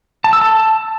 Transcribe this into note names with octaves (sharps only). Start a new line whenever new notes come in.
A5
E6
A5